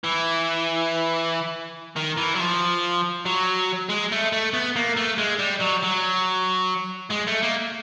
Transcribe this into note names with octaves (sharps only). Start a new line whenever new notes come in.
E3
D#3
E3
F#3
F3
F#3
G#3
A3
A3
B3
A#3
A3
G#3
G3
F#3
F#3
G#3
A3
A#3